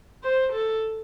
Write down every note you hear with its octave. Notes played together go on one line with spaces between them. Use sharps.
C5
A4